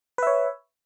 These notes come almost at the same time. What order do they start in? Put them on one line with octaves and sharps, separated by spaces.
B4 E5 C#5